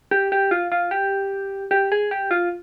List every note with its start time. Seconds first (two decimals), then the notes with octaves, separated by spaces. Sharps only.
0.11 G4
0.32 G4
0.51 F4
0.72 F4
0.91 G4
1.71 G4
1.92 G#4
2.11 G4
2.31 F4